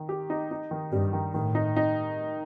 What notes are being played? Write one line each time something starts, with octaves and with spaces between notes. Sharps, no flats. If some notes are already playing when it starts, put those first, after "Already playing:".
Already playing: D#3
G4
D#4
D#4
D#3
G2 G3
D#3
A2 D#3
D#4
D#4